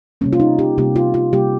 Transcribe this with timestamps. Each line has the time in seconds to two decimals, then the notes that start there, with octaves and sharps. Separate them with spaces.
0.21 C3 G3 A#3 C#4
0.33 F4
0.40 D#4
0.59 G4
0.78 C3 G3 A#3 G4
0.96 F4
1.14 F4
1.33 C3 G3 A#3 G4